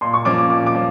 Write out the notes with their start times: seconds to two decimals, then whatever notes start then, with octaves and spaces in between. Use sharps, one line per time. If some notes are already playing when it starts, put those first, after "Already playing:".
0.01 A#2 C6
0.14 C#6
0.25 F3 A#3 C#4 D6
0.38 D6
0.50 A#2 D6
0.66 D6
0.75 F3